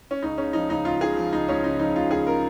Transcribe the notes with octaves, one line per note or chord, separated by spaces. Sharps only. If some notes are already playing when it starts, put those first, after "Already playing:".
C#4
C#2 D#4
C#3 C#4
F3 D#4
C#2 D#4
C#2 F4
C#3 G#4
F3
C#2 D#4
C#2 C#4
C#3 D#4
F3 D#4
C#2 F4
C#2 G#4
C#3 A#4